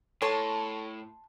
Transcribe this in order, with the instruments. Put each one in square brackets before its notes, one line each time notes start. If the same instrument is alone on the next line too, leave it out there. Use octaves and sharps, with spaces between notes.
[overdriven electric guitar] A2 [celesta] A4 [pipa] C#5 [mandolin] A5 C6